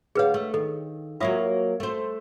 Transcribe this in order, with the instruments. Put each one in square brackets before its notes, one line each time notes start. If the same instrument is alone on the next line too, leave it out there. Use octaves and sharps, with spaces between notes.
[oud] D2 F5 [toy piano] G#4 B4 C#5
[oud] A3
[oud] D#3 [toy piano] A4
[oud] F#3 A#3 C#5 [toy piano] F4 E5 D#6
[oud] A3 C5